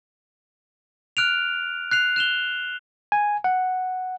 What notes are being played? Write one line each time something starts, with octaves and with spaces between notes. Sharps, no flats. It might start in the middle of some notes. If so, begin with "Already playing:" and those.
F6 F#6 D7 F7
F#6 C7 F7
F#6 E7 F7 G7
G#5
F#5